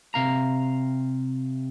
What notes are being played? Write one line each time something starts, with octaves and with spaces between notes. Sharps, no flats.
C3 F5 A#5